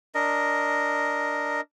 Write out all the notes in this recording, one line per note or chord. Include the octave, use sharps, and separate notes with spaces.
D4 A#4 D#5